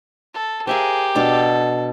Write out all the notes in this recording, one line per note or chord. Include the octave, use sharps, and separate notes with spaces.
A4
G4 G#4 A#4 C5 E5 F5
B2 D4 A4 D6